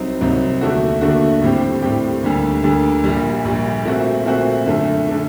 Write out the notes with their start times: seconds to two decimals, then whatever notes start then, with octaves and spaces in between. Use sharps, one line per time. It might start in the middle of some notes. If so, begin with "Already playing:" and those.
Already playing: C2 C3 F#3 C4 D#4
0.20 C2 C3 F#3 C4 D#4
0.61 D#2 D3 A3 D4 F#4
1.01 D#2 D3 A3 D4 F#4
1.42 A2 G3 C4 G4
1.82 A2 G3 C4 G4
2.23 D2 D3 G3 A#3
2.64 D2 D3 G3 A#3
3.04 A#1 A#2 G3
3.45 A#1 A#2 G3
3.85 A#2 A3 C4 F#4
4.26 A#2 A3 C4 F#4
4.66 F#2 D3 A3
5.09 D3 A3